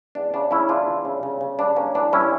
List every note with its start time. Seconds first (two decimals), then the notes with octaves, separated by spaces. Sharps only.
0.15 E2 D4
0.34 C#3 D4
0.51 C#3 C#4 E4
0.69 E2 D4 F4
0.87 E2
1.05 C#3
1.23 C#3
1.41 C#3
1.59 G2 D4
1.76 A#3 C#4
1.95 E3 D4
2.12 G2 C#4 E4